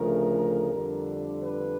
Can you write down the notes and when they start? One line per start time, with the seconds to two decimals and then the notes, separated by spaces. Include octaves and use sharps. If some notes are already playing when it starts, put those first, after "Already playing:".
Already playing: D2 C#3 F3 A3 A#4
0.72 F2 D3 G3
1.42 B4